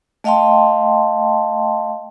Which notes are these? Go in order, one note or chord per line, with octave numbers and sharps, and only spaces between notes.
A3 D#5 F5 G5 A5 C6